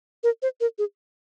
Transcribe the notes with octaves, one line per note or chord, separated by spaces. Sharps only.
A#4
C5
A#4
G#4